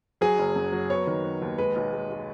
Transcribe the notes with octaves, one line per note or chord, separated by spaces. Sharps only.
F#3 G#4 G#5
F#1
F#2
F#3
B3 C#5
D#3
B3
D#2
G#3 B4
B1
G#3
G#3